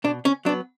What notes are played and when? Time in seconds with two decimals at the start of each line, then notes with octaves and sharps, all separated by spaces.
0.04 B2 D4
0.25 C#4
0.45 F#3 B3 D4